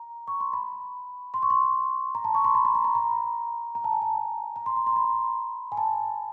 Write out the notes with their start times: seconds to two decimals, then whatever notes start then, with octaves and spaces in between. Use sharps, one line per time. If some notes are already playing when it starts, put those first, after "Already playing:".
Already playing: A#5
0.28 C#6
0.40 C6
0.53 B5
1.34 C6
1.43 C#6
1.50 C6
2.15 A#5
2.24 A5
2.35 C#6
2.45 C6
2.55 B5
2.65 B5
2.75 A#5
2.85 B5
2.95 A#5
3.75 A#5
3.84 A5
3.93 G#5
4.02 A5
4.56 A#5
4.66 C6
4.77 A#5
4.87 C6
4.92 A#5
4.96 B5
5.72 G#5
5.77 A5